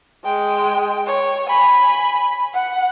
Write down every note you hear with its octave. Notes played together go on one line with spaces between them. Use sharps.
G#3 G5
C#5
G#5 B5
F#5